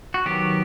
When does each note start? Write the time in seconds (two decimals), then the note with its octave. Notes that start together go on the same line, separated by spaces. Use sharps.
0.14 F#4
0.26 D#3 F#3 B3 G4